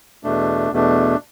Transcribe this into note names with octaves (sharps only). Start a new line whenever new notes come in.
E2 B2 A3 D4
E2 B2 A3 D4